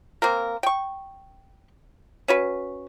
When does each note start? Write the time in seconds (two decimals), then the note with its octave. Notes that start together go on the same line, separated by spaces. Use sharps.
0.22 A#3 C4 A#4
0.63 G5 C#6
2.28 C#4 F#4 B4